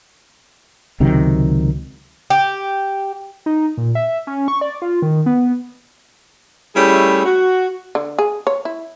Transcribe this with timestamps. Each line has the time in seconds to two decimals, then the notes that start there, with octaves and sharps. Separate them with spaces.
1.00 C#2 C3 D#3 F#3
2.30 G4
3.46 D#4
3.77 A#2
3.95 E5
4.27 C#4
4.48 C#6
4.61 D5
4.82 F4
5.02 D#3
5.26 B3
6.75 G3 A3 C#4 E4 G#4
7.25 F#4
7.95 D3
8.19 G#4
8.47 C#5
8.65 E4